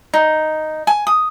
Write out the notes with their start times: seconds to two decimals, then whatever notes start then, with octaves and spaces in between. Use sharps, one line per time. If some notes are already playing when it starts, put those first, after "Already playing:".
0.14 D#4
0.87 G#5
1.07 D#6